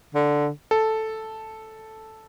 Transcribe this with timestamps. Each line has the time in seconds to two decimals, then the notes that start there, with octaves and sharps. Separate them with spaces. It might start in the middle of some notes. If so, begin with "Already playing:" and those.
0.15 D3
0.71 A4